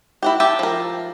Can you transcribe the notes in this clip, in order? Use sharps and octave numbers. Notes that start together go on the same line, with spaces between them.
E4 F#4 G4
G4 E5 A5
F3 A#4